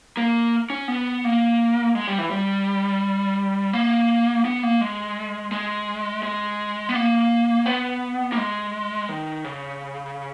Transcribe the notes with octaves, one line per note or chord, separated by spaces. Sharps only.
A#3
C#4
B3
A#3
G#3
G3
E3
G3
A#3
B3
A#3
G#3
G#3
G#3
B3
A#3
B3
A#3
G#3
D#3
C#3